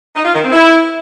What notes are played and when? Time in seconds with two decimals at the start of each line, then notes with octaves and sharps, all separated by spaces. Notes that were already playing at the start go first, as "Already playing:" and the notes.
0.15 D#4
0.24 F4
0.34 D#3
0.43 C4
0.52 E4